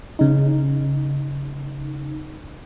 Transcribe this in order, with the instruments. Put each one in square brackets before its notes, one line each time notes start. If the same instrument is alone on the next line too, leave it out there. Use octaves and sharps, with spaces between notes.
[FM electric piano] C#3 D#4